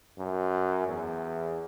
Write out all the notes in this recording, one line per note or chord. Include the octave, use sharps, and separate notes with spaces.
F#2
E2